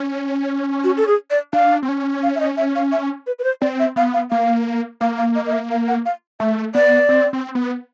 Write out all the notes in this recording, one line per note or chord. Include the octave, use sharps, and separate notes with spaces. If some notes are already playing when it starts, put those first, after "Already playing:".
Already playing: C#4
F#4
A4
G#4
D5
D4 F5
C4
C#4
F5
E5
D#5
E5
F5
E5
B4
B4
C5
C4 D5
E5
B3 F5
F5
A#3 F5
A#3 F5
F5
D#5
D#5
E5
F5
F#5
F5
A3 E5
B3 D5
C4
C4
B3